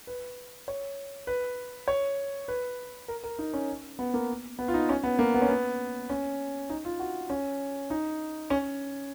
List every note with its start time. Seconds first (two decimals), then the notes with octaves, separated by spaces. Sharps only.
0.07 B4
0.68 C#5
1.27 B4
1.88 C#5
2.48 B4
3.08 A#4
3.24 A#4
3.39 D#4
3.54 C#4
3.99 B3
4.14 A#3
4.59 B3
4.68 F4
4.74 D#4
4.89 C#4
5.03 B3
5.19 A#3
5.35 B3
5.42 C#4
5.49 B3
6.10 C#4
6.70 D#4
6.85 F4
7.00 F#4
7.30 C#4
7.90 D#4
8.50 C#4